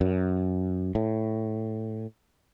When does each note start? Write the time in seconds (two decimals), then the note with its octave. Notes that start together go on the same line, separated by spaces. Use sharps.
0.01 F#2
0.95 A2